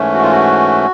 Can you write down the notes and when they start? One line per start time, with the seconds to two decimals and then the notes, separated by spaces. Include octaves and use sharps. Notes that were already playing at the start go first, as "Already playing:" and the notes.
Already playing: G#2 E3 A3 C#4
0.14 F#4
0.23 F4
0.31 F#4